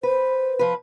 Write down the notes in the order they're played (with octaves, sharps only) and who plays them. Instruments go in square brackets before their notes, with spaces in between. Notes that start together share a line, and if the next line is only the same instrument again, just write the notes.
[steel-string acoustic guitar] B4 [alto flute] C5
[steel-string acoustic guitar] F3 B4